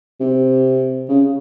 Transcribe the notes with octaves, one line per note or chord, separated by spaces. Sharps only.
C3
C#3